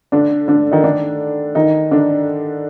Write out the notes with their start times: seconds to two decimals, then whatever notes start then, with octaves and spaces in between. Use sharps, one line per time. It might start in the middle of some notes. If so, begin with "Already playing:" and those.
0.12 D3 D4
0.48 D3 D4
0.72 D#3 D#4
0.84 D3 D4
1.55 D#3 D#4
1.91 D3 D4